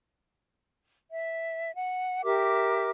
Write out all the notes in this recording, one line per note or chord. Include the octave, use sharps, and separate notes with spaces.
E5
F#5
G4 A#4 E5 D6